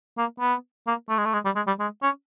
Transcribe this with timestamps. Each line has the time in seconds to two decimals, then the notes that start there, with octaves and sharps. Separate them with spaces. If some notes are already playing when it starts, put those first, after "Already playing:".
0.18 A#3
0.40 B3
0.87 A#3
1.09 A3
1.18 G#3
1.25 A3
1.33 G#3
1.45 G3
1.56 G#3
1.67 G3
1.80 G#3
2.03 C#4